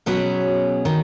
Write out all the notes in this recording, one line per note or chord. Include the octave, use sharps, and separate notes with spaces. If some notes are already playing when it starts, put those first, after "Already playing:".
B2 F#3 B3 C#4 G#4
D#3